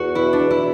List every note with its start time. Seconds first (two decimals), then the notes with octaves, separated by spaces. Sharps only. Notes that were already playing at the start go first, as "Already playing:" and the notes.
Already playing: E2 F#4
0.15 B2 E4
0.33 D4
0.39 E2
0.51 E4